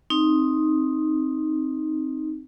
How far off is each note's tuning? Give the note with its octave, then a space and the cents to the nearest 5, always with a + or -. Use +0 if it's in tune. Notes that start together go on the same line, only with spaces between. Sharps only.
C4 +15 D#4 +0